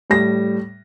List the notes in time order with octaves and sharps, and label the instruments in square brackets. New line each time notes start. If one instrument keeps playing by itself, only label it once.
[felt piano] A2 G3 A#6